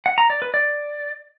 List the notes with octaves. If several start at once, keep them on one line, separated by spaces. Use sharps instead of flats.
F#5
A#5
D5
B4
D5